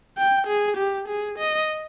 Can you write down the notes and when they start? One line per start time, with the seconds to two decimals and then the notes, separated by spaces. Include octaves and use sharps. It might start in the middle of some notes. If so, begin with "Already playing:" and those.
0.18 G5
0.47 G#4
0.77 G4
1.08 G#4
1.39 D#5